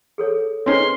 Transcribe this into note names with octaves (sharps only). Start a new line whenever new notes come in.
G#4 A4 C#5
C4 C#4 D#4 G#4 B4 C#5 C6